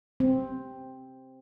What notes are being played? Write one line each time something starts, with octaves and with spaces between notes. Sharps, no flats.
C4